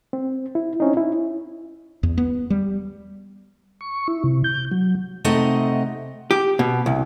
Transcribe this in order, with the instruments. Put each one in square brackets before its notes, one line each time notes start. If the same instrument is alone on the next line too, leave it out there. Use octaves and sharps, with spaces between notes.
[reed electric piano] C4
E4
C4 C#4 D#4
E4
[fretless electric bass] E2
B3
G3
[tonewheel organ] C#6
E4
C3
G6
F#3
[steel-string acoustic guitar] C3 A3 D#4 D#5 F#5
[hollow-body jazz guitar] G4
B2
C2